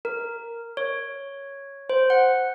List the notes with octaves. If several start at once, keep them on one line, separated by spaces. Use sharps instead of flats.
A#4
C#5
C5
F#5